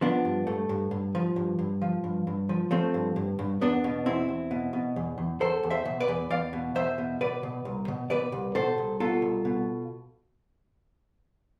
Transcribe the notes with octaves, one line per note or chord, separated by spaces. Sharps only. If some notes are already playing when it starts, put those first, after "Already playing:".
F3 B3 D4
G2
G2 A3
G2
G2
F3
G2
G2
F3
G2
G2
F3
F3 A3 C4
G2
G2
G2
E2 B3 D4
B2
E2 C4 E4
E2
B2
B2
E2
E2
E2 A4 C5
E2
C5 E5
B2
B4 D5
E2
E2 D5 F5
B2
E2 C5 E5
B2
B2 B4 D5
B2
C2
B2
B2 B4 D5
C2
B2 A4 C5
C2
B2 F4 A4
C2
B2